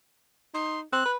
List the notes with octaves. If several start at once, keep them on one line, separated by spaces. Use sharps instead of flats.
D#4 C6
C4 F#6
B4